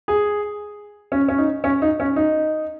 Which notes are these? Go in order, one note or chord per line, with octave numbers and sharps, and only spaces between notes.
G#4
C#4
C#4
D#4
C#4
D#4
C#4
D#4